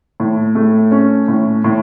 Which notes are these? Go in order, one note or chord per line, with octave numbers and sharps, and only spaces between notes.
A2
A3
C#4
A2
A2